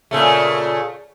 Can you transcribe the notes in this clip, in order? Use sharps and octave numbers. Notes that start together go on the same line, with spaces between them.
A#2 C#3 A3